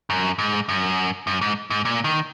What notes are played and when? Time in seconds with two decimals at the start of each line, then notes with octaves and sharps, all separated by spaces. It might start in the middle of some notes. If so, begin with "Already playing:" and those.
0.10 F#2
0.39 G#2
0.69 F#2
1.27 F#2
1.41 G#2
1.70 G#2
1.85 A#2
2.04 D#3